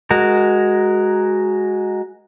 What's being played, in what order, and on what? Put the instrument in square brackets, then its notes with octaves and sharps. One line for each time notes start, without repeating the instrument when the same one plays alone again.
[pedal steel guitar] G#3 F#4 A#4